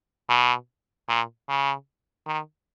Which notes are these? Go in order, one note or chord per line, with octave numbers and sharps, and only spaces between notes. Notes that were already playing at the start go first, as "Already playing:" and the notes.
B2
A#2
C#3
D#3